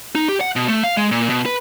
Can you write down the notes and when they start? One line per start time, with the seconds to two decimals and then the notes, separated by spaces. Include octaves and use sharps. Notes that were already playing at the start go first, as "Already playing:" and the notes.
0.15 D#4
0.29 G4
0.41 F#5
0.56 B2
0.67 A3
0.83 F5
0.97 G#3
1.11 A#2
1.30 B2
1.46 B4